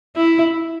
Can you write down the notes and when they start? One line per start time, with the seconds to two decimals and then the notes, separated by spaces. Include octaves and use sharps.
0.16 E4